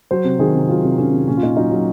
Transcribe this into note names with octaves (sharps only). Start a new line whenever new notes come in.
F#3 C5
C3
D#3 G#4
C3
F#3 F4
C3
D#3 C#4
C3
A#2 C#4
F4
A#2 D#4
F#3 D#4
F#3